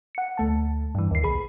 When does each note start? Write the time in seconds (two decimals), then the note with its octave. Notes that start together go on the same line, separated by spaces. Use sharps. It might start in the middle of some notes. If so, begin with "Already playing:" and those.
0.15 F#5 C#7
0.37 D2 A3 A5
0.95 G2 E3
1.11 D#2 C7
1.23 B1 G#4 B5